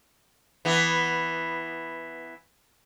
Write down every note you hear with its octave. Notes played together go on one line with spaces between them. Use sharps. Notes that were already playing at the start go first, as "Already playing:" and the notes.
E3 B3